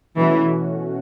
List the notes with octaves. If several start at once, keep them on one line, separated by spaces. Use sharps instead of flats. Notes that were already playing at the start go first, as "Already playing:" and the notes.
B2 E3 A3 C#4 F#4